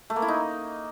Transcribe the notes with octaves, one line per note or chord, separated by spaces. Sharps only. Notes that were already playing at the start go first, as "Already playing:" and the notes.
A3
A#3
E4
D#4